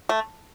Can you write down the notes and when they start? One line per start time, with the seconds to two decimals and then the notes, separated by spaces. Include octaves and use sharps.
0.09 A3